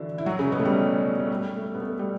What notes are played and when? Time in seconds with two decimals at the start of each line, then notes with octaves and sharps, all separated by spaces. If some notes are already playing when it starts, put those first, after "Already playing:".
Already playing: D3 E3 F#3 D4 E4 F#4
0.18 E4
0.26 F#3 F#4
0.39 C#3 C#4
0.52 B2 B3
0.59 A3
0.65 G3
1.19 A3
1.30 G3
1.56 A3
1.75 B3
1.82 A3
1.99 G3 G4